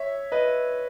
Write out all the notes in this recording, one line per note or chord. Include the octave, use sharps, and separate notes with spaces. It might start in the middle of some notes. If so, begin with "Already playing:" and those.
Already playing: C#5 E5
B4 D#5